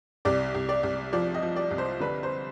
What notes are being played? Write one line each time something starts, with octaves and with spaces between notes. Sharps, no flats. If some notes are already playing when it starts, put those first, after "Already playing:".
C2 D5
C2
D5
C2
F3 D5
D#5
F3
D5
C2
C5
D3 B4
C5